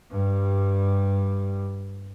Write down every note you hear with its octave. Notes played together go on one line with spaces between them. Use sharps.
G2 G3